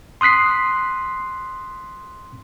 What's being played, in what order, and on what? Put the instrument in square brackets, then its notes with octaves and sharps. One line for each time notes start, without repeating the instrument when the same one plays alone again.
[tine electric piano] C6 D#6 F#6 B6 C7